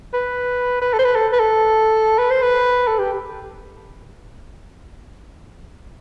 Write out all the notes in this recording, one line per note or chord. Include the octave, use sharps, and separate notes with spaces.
B4
B4
A4
C5
B4
A4
B4
A4
B4
C5
B4
A4
G4